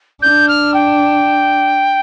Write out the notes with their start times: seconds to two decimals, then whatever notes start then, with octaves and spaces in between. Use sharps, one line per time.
0.21 D4 G6
0.48 F6
0.74 G5